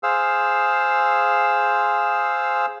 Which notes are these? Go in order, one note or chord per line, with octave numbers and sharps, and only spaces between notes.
G#4 C5 F5 E6